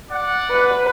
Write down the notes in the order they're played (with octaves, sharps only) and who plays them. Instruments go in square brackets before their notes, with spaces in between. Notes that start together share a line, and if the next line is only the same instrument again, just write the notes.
[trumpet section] D5 F#5
[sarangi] B4